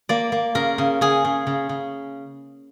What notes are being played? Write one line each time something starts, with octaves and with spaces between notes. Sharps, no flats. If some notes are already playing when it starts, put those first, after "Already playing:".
A#3 D5
A#3
C#3 A#4
C#3
C#3 G#4
C#3
C#3
C#3